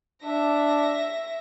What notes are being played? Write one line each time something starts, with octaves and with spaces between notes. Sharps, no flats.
D4 E5 A#6